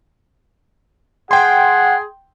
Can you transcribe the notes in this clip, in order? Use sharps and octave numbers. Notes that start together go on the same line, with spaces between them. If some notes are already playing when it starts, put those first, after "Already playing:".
G#4 F#5 G5 C6